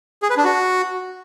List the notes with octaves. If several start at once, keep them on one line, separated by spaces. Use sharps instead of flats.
G#4
B4
D4
F#4